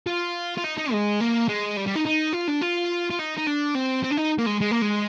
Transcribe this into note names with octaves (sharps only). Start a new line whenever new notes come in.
F4
F4
D#4
D#4
G#3
A#3
G#3
G3
G3
D#4
D#4
F4
D4
F4
F4
D#4
D#4
D4
C4
C4
D4
D#4
A#3
G#3
G#3
A#3
G#3